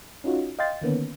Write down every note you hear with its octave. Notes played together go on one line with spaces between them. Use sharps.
C#4 D#4 F4 F#4
D#5 F5 G5 C6 A6
D3 D#3 A#3 B3 C#4